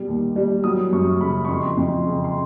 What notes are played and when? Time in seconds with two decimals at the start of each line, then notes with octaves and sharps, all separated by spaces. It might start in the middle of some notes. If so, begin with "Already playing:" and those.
Already playing: B2 G3
0.08 D#2
0.36 G3
0.64 F#3 D#6
0.92 F#2 C#6
1.20 C#3 B5
1.45 C#6
1.48 F2 C6
1.77 F2
2.05 C#3
2.24 C6